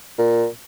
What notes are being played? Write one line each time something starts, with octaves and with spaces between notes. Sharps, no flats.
A#2